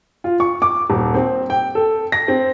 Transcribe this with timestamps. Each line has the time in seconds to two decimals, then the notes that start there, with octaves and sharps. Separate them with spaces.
0.24 F4
0.40 C#6
0.62 D6
0.90 D#1
1.14 C4
1.50 G5
1.75 A4
2.12 A#6
2.28 C4